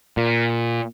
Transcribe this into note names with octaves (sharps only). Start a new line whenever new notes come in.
A#2